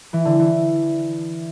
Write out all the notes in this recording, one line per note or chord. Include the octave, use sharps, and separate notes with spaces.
E3
D3
E3